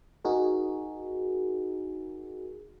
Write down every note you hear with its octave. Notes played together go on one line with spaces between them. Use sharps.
D#4 F#4 G#4 A#4